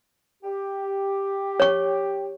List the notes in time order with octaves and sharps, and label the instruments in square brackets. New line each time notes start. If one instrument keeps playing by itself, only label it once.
[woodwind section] G4
[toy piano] C#5 C#6